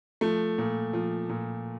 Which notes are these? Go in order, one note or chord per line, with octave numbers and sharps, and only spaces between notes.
F3 A3
A#2
F3
A#2